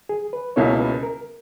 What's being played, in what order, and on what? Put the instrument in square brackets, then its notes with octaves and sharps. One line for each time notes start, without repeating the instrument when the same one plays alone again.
[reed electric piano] G#4
B4
[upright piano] C#2 B2 A#3 C#4 E4 [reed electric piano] C#5
[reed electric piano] B4
A#4